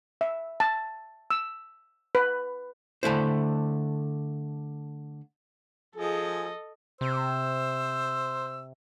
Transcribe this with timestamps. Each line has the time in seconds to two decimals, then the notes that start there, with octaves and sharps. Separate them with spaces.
0.21 E5
0.60 A5
1.30 E6
2.15 B4
3.03 D3 A3 E4 C5
5.96 F3 G#4 A4 D#5
7.01 C3 C5 E6